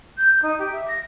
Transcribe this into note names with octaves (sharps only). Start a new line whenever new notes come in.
G6
D#4
G4
E5
A#6